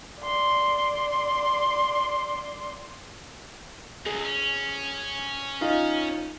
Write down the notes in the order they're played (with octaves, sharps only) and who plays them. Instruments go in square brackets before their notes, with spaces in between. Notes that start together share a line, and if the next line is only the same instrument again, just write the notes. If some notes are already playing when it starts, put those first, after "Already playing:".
[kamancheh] D5 C6
[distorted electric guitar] C#2 [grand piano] G#4
[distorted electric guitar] C#4
[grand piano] D#4 F4